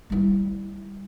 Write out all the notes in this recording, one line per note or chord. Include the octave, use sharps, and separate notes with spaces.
G3 E4